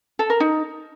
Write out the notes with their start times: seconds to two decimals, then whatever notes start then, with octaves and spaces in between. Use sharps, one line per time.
0.19 A4
0.30 A#4
0.40 D#4